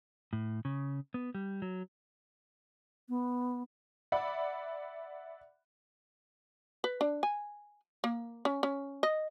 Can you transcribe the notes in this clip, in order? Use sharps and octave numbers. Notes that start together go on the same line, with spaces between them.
A2
C#3
B3
G3
F#3
B3
D5 E5 F#5 B5
B4
D4
G#5
A#3
C#4
C#4
D#5